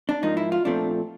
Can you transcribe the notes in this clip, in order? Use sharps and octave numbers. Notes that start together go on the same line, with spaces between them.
D4
G#2 F3 A#3 D#4
E4
F4
A#2 F3 A3 C4 D4